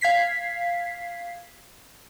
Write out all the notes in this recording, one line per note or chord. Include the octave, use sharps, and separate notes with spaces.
F5 G#6 B6 C7